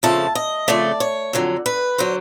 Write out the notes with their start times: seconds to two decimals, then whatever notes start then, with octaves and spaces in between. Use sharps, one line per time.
0.03 F2 C#3 F3 A3 A5
0.35 D#5
0.68 F2 C#3 F3 A3 D5
1.00 C#5
1.33 F2 D3 F#3
1.66 B4
1.98 D3 F#3 C5